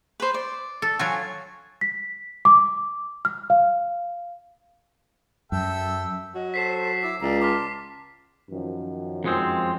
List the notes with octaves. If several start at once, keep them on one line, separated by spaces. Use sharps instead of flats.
B4 C5
D5
A4
F#3 F4 F#4 G#5
B6
D6
F6
F5
F#2 A4 E5 G5
F#3 D#5
A4 C5 B6 C7 E7
E4 D6 E6
C#2 D5 A#5
A5 C6 D6 F6 B6
F#2 D#3 F3
F2 G#3 C4